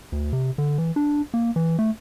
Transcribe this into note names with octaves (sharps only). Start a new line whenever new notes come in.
D2
C3
D3
E3
D4
A#3
E3
A3